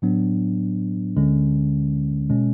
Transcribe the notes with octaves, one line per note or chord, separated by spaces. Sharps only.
A2 F#3 B3 D4
D2 D3 G#3 C#4
B2 G#3 C#4